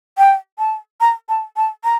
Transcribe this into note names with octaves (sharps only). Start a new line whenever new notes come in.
G5
A5
A#5
A5
A5
A#5